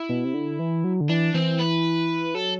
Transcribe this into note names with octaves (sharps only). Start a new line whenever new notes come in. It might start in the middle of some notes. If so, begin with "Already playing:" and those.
Already playing: E4
B2
C3
D3
E3
F#3
D3
E3 D4
E3 C4
B4
F#3 A4